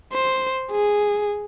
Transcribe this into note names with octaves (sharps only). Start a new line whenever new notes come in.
C5
G#4